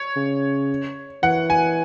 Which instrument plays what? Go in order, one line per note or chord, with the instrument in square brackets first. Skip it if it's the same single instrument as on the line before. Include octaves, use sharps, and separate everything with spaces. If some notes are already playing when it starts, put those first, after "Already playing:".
Already playing: [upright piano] C#5
[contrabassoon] C#3
[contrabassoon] E3 [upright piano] F#5
[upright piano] G#5